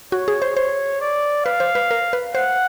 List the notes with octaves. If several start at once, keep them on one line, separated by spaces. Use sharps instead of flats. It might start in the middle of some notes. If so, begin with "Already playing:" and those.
F#4 C#5
G#4
C5
C5 C#5
D5
B4 F5
C5
B4
A#4
B4
C5 F#5